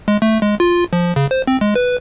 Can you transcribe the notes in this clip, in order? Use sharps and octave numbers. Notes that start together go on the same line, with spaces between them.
G#3
A3
G#3
F4
F3
C#3
C5
C4
G#3
B4